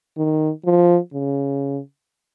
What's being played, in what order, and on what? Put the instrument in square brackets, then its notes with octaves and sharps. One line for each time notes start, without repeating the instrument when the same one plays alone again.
[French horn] D#3
F3
C#3